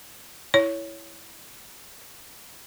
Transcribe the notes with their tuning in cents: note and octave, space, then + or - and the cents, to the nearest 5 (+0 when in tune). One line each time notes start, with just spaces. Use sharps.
E4 +0 C#5 +10